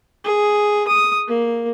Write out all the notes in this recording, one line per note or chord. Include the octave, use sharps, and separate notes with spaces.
G#4
D#6
A#3